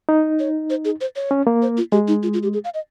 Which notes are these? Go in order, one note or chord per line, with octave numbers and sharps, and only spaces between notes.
D#4
C#5
C5
G#4
C5
C#5
C#4
A#3
C5
F4
G#3 G4
D#4
F4
F4
G4
G#4
F5
D#5